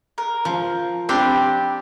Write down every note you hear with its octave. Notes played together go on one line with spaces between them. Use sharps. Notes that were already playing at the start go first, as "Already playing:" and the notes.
A#4
F3
C4 D4 G4 G5 B5 C6